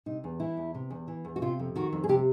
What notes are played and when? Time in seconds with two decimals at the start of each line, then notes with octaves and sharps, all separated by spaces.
0.06 C3 D#4
0.24 E2
0.40 E3 E4
0.57 E2
0.75 C3
0.91 E2
1.08 E3
1.25 E2
1.36 F#4
1.42 C3 F4
1.59 F2
1.76 D#3 F#4
1.93 F2
2.04 G#4
2.09 C3 G4